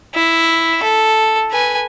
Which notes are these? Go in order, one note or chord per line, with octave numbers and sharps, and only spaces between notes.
E4
A4
B4 G#5